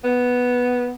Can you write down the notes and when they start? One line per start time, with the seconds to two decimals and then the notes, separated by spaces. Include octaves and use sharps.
0.04 B3